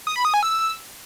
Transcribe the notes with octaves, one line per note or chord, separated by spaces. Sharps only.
D#6
B5
D#6
G#5
E6